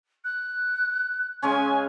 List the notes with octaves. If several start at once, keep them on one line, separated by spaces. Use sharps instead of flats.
F#6
C#3 G#3 C#4 G#5